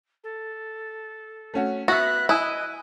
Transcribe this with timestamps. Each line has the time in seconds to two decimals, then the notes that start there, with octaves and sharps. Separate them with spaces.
0.24 A4
1.54 A3 C#4 F#4
1.88 B3 F#4 E5 F#6 A#6
2.29 E4 D#5 G#5 D#6 F#6